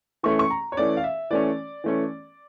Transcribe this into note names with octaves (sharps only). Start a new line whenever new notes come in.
E3 A3 C#4 C#6
C#6
A#5
C#5
E3 A3 C#4 D5
F5
E5
E3 A3 C#4 D5
E3 A3 C#4